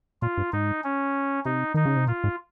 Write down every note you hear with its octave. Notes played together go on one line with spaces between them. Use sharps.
A#2 F4
G2
G#2 D#4
C#4
C3 D#4
D#3 D#4
C#3
C3
A#2 F4
G#2